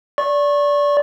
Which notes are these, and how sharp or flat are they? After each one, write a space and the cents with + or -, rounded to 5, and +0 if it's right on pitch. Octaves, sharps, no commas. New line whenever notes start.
D5 -20 C#6 -25